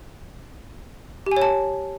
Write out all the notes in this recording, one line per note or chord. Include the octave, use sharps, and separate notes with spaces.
G4
G#5
C#5
A5